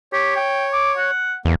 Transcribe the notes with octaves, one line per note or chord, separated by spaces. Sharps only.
G4 C#5
G5
D6
F#5
E2 A#3